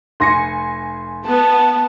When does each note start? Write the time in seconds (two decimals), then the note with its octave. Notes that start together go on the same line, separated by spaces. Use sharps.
0.20 F1 G#5 C6 A#6 C#7
1.26 B3 A5